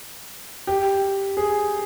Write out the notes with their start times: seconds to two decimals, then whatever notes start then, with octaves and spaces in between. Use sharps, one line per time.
0.67 G4
1.37 G#4